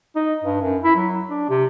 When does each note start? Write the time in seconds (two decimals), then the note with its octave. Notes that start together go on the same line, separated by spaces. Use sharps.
0.16 D#4
0.44 G2
0.62 F#2
0.84 E4
0.96 F#3
1.29 D4
1.49 C3